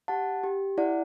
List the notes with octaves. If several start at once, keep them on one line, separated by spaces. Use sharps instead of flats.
G4 F#5 A5
G4
E4 D5 F#5